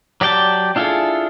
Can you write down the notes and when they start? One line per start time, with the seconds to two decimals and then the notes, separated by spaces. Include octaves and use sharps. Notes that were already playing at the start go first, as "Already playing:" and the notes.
0.21 F#3 G4 D5 G5 A5
0.76 D4 E4 F4 G#4 A4